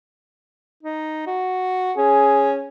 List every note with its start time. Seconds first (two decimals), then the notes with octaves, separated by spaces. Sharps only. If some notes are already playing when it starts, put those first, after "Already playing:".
0.83 D#4
1.26 F#4
1.97 C#4 G#4